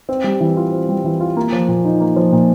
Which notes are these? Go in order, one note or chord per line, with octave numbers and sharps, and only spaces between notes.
C4
G3
E3
F4
C4
G3
E3
F4
A#3
F3
A#2
D#4
A#3
F3
A#2